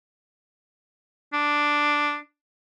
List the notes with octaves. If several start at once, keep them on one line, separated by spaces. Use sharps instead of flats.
D4